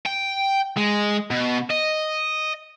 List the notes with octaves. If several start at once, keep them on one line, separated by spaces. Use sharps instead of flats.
G5
G#3
B2
D#5